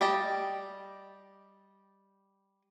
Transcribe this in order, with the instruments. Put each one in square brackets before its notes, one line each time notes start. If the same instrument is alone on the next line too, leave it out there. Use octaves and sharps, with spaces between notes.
[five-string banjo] G3 G4 D#5 A5